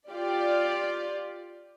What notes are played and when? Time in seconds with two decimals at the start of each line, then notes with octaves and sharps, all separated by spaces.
0.11 F4 G4 D5